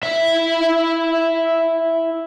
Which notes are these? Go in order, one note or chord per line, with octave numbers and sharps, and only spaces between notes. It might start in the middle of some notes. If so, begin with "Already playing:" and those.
E4 E5